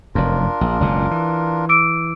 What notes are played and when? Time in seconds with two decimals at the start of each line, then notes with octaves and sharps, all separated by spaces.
0.15 F1 F#2 D4 F4 A#4
0.61 A#1
0.81 F#1 C#2 B2
1.11 E3
1.69 D6 E6 D7